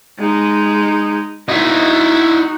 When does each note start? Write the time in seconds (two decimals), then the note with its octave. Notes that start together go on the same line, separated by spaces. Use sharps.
0.18 G#3 D#4
1.49 D#4 E4 F#4 D#5